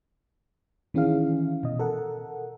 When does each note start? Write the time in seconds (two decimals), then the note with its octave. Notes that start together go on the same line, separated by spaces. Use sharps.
0.94 D#3 E3 C#4 E4 G#4 F5
1.63 B2 D#5
1.79 A4 A#4 F#5